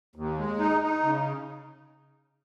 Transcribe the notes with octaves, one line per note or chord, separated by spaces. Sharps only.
D#2
G#3
D#4
D#4
C#3